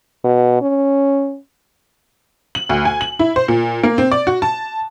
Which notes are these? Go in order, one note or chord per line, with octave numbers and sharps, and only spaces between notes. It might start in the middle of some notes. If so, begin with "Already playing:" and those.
B2
C#4
F#7
D2
G#5
F#7
E4
C5
A#2
A#3
C4
D5
F#4
A5